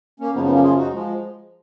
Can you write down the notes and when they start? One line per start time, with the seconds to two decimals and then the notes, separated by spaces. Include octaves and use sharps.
0.20 A#3 C#4
0.34 F#2 C#3 F3 B3 D#4
0.44 B3 D#4
0.53 A#3 C#4
0.63 F4 G#4
0.78 D#4 F#4
0.93 F3 G#3